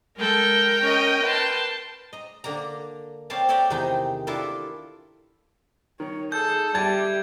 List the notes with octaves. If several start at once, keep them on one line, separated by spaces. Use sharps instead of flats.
G#3 A4 A#4 G5
C#4 D#5
B4 A5 C6
D#5 A#5
D3 A#3 D5 A#5
C4 C#5 D5 F5 A5 A#5
A4 C#5 D5 E5 G5 A#5
E2 C3 D#3 G#3 D#4 G5
D4 E4 F4 A4 A#4
D#3 C#5
D#4 G#4 A4 G6
G3 G4 E5 A5 G#6